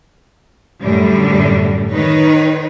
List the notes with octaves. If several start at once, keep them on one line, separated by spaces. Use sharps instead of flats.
F#2 A2 D3 G3
D#3 D#4 B4 C#5